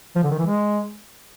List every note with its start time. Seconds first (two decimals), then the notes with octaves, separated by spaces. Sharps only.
0.16 F3
0.23 D3
0.31 D#3
0.39 E3
0.46 G#3